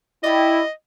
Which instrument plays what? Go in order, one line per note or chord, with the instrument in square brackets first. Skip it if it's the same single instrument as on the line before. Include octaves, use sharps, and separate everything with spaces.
[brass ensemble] E4 [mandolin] G4 D5 [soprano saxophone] D#5